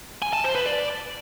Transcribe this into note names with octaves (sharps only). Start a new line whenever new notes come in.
G#5
A5
C5
B4
D5